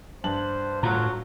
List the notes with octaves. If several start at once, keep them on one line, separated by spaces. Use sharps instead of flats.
G2 C5 A5 F#7
A2 F4 F#4 A#5